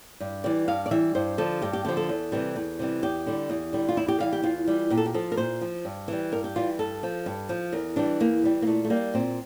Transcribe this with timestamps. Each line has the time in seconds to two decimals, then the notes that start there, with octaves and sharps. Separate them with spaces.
0.20 G2
0.44 E3 G3 D5
0.68 G2 F5
0.86 D5
0.91 E3 G3 E5
1.15 G2 C5
1.38 D3 F3 A4
1.62 G2 G4
1.73 G4
1.85 D3 F3 G4
1.97 A4
2.09 E2
2.32 C3 E3 G3
2.56 E2
2.79 C3 E3 G3
3.03 E2 G4
3.27 D3 G3
3.50 E2
3.73 D3 G3
3.89 F4
3.97 E2 E4
4.08 G4
4.20 E3 G3 F5
4.33 G4
4.43 E2 F4
4.67 E3 G3
4.90 A#2 G4
4.97 A4
5.06 G4
5.14 F3 A4
5.32 A#4
5.37 A#2 C5
5.61 F3
5.85 G2
6.08 E3 G3
6.32 G2 A#4
6.44 G4
6.56 E3 G3 F4
6.79 G2 A4
7.03 F3
7.26 G2
7.49 F3
7.73 E2 A#4
7.96 E3 G3 D4
8.20 E2 A#3
8.44 E3 G3
8.62 A#3
8.67 A#2 A3
8.85 A3
8.90 G3 A#3
9.14 A#2 C4